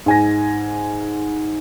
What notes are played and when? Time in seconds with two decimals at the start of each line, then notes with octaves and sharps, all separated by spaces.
0.06 G#2 G#5 A#6